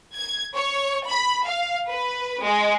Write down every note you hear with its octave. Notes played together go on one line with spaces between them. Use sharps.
G#6
C#5
B5
F5
B4
G#3